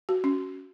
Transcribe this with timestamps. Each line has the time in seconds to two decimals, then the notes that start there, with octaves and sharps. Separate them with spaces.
0.09 F#4
0.24 C#4